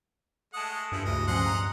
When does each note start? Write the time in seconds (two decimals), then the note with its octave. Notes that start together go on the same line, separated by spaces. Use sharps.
0.54 G#3 A3 F#5 A5 D#6
0.92 G2 F3 E4
1.05 D2 C#3 E3 D#5
1.27 A#2 F3 C#4 D#5 F#5 C6
1.46 A#5